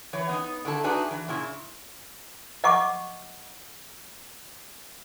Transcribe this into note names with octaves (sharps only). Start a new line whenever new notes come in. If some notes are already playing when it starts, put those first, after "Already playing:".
E3 C#5
B3 D#4
D3 D#3 E4 A4
D4 D#4 F#4 G#4 B4 E5
E3
A#2 C#3 E4
D#5 F#5 C#6 D6